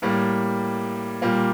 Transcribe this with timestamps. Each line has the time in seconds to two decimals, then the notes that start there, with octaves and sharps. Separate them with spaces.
0.02 A2 G3 A#3
1.22 A#2 G3 A#3